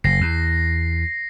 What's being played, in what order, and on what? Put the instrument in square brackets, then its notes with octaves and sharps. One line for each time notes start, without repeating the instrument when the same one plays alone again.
[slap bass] F#1 [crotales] A#6 C7
[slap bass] E2